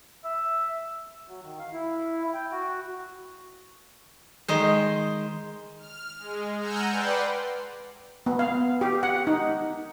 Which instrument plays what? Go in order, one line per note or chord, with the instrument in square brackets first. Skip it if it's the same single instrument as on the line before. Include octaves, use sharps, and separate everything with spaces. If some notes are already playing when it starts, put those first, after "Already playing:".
[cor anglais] E5
[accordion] F#3
D#3
F5
E4
G5
F#4
[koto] D#3 G#3 C5
[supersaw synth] F6
G#3
F#5 G#5 A#5 E6 F6 G6
B4 D5 F#5 G5 C6
[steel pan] B3
F5
G4
F#5
D#4